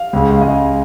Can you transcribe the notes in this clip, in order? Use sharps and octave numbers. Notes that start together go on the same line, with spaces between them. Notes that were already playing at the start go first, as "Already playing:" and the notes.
Already playing: F5
C#2 C#3 G#3
F5
C#2 C#3 G#3 D#5